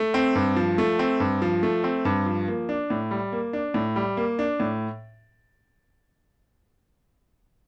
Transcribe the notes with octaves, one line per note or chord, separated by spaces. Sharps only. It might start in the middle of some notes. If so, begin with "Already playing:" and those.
Already playing: A3
C4
G2
F3
A3
C4
G2
F3
A3
C4
G2
F3
A#3
D4
A2
G3
A#3
D4
A2
G3
A#3
D4
A2